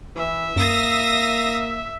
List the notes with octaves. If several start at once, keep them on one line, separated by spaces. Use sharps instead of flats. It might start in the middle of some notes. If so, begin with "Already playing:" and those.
E3 E5
F#2 A#3 F5 D#6 A#6